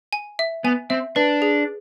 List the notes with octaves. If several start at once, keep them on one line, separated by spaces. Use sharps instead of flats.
G#5
E5
B3 G#5
C4 E5
D4 B4
G#4